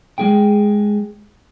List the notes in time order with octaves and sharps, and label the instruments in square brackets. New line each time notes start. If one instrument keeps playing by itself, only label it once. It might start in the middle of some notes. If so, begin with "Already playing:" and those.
[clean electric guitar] G#3 G#4 G5